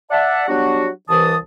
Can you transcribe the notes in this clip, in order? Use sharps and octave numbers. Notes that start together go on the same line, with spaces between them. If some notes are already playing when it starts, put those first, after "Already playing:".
D5 E5 F#5 A5
F#3 G3 B3 D4 F#4
C2 E3 A5 D#6